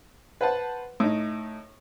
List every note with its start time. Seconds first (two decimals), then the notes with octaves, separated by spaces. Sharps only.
0.41 B4 C5 F#5 A5
1.00 A2 D#4